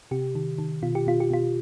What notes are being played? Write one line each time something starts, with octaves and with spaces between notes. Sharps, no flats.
C3 G4
D#3
D#3
B2 F4
G4
B2 F4
G4
B2 F4